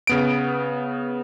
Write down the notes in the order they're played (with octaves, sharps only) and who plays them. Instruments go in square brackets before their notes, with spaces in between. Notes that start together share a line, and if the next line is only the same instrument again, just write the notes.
[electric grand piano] C#3 B3 D7